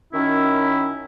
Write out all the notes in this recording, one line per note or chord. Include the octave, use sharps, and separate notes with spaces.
F#2 D#3 C#4 E4